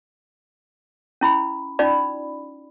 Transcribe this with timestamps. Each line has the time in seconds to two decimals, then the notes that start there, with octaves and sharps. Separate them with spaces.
1.21 C#4 E4 B5
1.79 C#4 D#4 F4 D5 B5